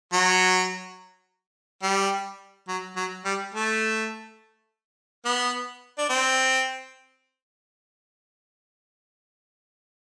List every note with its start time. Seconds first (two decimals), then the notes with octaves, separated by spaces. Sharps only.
0.13 F#3
1.83 G3
2.69 F#3
2.96 F#3
3.25 G3
3.54 A3
5.25 B3
5.98 D4
6.10 C4